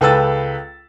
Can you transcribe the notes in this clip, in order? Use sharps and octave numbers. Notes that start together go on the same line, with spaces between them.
C#2 A4 B4 G5 E6 A6